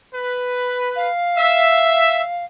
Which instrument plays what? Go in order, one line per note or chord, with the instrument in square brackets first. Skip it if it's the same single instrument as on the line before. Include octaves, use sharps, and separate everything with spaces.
[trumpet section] B4
[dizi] F5
[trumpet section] E5